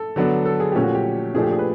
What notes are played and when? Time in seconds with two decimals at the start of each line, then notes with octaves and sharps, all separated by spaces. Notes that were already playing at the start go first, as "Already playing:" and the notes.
Already playing: A4
0.16 D3 F#3 B3 D4
0.45 A4
0.60 G#4
0.72 A#2 F3 A3 C#4 G4
0.83 F#4
0.95 G4
1.35 A#2 F3 A3 D4 G#4
1.43 G4
1.51 G#4
1.59 B4